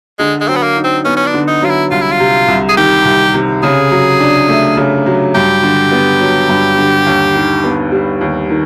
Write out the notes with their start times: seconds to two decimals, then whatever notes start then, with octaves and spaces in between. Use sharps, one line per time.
0.19 D3 G#3
0.41 G#3
0.48 F#3 C4
0.56 B3
0.63 A#3
0.77 D#4
0.84 C4
1.05 B3 C#4
1.17 C#4
1.26 D4
1.34 D3
1.48 D#4
1.62 F#3 F4
1.70 E4
1.91 C2 F4
2.02 E4
2.12 F4
2.20 C3
2.48 C2
2.69 G#4
2.77 D#3 G4
3.05 C2
3.34 C3
3.63 C#3 G#4
3.91 F#3
4.20 D4
4.49 A3
4.77 C#3
5.06 F#3
5.35 G2 G4
5.63 D3
5.92 B3
6.21 F#3
6.49 G2
6.77 D3
7.06 D#2
7.35 D#3
7.64 B3
7.92 G3
8.21 D#2
8.50 D#3